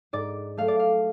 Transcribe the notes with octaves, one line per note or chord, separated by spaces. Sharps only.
G#2 D5
F#3 A3 F5
D5
F5